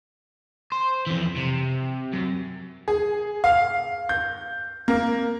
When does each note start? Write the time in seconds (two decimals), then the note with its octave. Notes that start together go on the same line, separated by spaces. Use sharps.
0.72 C5
1.07 F2 E3
1.37 C3
2.14 F#2
2.88 G#4
3.44 F5
4.09 G6
4.88 A#3